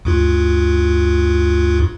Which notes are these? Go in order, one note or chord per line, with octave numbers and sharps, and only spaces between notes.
D2 G2 F4